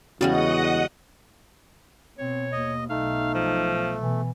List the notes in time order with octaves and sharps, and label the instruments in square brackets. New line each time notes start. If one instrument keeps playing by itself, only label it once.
[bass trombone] E2 [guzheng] C#3 G3 G#3 [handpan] F#4 [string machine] D#5 F#5 D#6
[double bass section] B2 [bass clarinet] C4 [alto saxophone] C#5
[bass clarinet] D#2 [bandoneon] D#5
[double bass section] B1 [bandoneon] A3 [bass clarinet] D#4 [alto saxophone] F5
[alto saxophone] F3
[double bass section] B2 [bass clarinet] E3